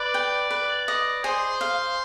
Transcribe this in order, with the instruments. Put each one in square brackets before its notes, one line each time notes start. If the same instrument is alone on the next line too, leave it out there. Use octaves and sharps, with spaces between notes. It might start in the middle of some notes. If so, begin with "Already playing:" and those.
Already playing: [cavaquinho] B4 [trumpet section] D5
[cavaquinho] G5
B4
D#5
[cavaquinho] G#4 [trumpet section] C5
[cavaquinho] F5